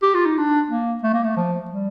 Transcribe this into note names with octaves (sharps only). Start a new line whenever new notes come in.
G4
F4
D#4
D4
A#3
A3
A#3
A3
F3
G3